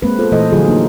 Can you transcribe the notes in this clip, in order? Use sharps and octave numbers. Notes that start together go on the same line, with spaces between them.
G#3 A#3 C4 B4
B3 F4 A4 C5
A#2 E3 A3 A4 C5 D#5
D3 F3 F#3 F4 G#4
A#3 D#4